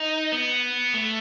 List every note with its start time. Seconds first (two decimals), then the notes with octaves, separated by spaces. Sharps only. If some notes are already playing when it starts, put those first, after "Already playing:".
Already playing: D#4
0.32 B3
0.94 A3